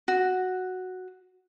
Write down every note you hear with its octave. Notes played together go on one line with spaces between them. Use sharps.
F#4